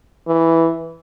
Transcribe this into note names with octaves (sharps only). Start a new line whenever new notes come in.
E3